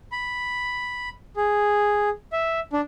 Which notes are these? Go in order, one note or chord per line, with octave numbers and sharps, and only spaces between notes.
B5
G#4
E5
D4